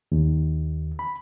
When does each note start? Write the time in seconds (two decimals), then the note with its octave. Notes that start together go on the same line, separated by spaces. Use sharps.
0.12 D#2
0.99 B5